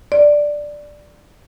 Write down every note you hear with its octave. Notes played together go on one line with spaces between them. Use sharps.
D5